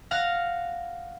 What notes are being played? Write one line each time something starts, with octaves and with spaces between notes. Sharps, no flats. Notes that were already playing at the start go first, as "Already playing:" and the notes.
F5 F#5 F6 A#6